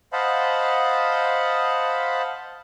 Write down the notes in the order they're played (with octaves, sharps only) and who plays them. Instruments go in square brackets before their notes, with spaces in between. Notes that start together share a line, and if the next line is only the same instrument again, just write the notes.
[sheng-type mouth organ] C5 D#5 F5 F#5 A5 B5